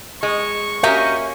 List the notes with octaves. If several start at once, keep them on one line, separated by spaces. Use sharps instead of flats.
G#3 C#6
A#3 C#4 F#4 G4 D#5 E5